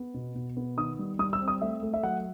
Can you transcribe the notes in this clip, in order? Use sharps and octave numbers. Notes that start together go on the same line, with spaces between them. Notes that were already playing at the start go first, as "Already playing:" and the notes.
Already playing: B3
B2
B2
B3
D#3 D#6
G3
G3 D#6
E6
C4
D#6
A3 E5
A3
E5
F#3 F#5